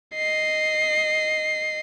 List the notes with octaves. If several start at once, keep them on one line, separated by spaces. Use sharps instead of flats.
D#5 C7